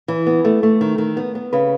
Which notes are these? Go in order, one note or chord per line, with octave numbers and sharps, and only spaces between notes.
E3
B3
A3
A3
D#3
D#3
B3
B3
C#3 B4